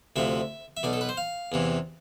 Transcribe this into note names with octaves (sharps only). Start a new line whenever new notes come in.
D2 C3 F3 E5
E5
B1 B2 D5
A4
B4
C5
F5
E2 C3 E3